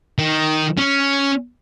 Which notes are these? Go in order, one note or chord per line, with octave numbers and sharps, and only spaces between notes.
D#3
C#4